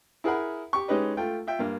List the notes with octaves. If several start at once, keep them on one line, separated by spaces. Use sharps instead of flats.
E4 G#4 A#4 F#5 B5
G4 C#6
G#3 C#4 D#4 G4 B4 D#5
A3 F4 G5
F4 E5 G5
G2 A#3